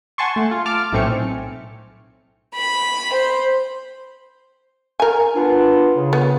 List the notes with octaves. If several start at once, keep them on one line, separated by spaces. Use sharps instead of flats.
F#5 G#5 A5 C6 C#6
A3
F4
A5 D6 F6
B1 A2 A3 C4 G#5 C#7
B5
C5
A#4 G#5
B3 D4 F4
C#3
B3